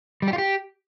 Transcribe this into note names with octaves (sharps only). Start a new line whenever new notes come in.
G3
G4
F4
G4